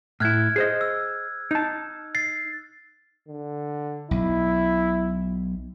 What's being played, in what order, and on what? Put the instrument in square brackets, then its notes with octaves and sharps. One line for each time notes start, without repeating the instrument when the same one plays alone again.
[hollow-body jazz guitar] A2 E4 [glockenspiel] F6 F#6 G#6
[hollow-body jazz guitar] G#4 C5 D#5
[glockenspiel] E6
[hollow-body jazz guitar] D#4 A5
[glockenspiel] A6 C7
[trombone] D3
[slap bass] B1 [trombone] E4